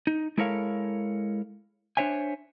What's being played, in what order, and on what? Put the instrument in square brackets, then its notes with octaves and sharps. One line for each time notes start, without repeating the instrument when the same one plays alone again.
[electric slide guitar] D#4
G#3 E4 A4 A#4 C#5 F5
D4 C5 C#5 E5 G#5